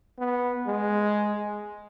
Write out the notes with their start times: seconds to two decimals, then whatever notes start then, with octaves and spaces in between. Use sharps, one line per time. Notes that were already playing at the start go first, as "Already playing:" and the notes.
0.19 B3
0.67 G#3